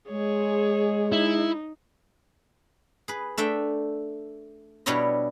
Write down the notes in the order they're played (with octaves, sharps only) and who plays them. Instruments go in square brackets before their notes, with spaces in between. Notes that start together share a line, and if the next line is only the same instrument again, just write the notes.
[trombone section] G#3 [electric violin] G#4 C#5
[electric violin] D#4 [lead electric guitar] E4
[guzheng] G#4 B4
A3 D4 E5 G5
B2 G3 D4 E4 C#5 D#5